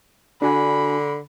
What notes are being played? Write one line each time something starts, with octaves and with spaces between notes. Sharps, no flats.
D3 D4 F#4 G#5 B5